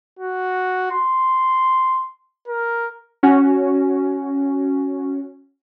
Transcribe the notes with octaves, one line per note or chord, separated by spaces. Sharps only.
F#4
C6
A#4
C#4 F#4